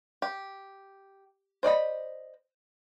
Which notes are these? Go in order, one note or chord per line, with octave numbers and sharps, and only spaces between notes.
G4
C5 D5 D#5 B5